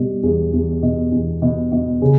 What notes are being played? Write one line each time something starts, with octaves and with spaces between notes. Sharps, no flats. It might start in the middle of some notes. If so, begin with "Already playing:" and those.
Already playing: B2 G3
E2
E2
B2
E2
B2
B2
C#3